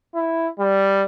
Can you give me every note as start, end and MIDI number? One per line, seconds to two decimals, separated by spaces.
0.14 0.48 64
0.59 1.03 55